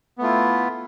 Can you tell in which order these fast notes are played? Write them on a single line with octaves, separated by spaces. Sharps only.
B3 A3 F4 E4